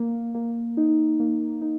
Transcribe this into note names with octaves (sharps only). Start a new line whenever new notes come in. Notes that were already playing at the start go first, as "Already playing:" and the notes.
Already playing: A#3
A#3
D#4
A#3
D#4